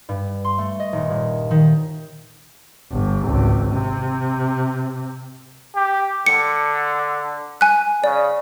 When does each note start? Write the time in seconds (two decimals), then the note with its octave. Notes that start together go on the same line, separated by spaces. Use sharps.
0.09 G2
0.45 C6
0.58 A3
0.79 D#5
0.93 D#1
1.10 A#2
1.51 D#3
2.92 G1
3.26 G#1 C#2
3.72 C3
5.76 G4
6.26 D3 C#7
7.61 G#5 F#6
8.04 C#3 D5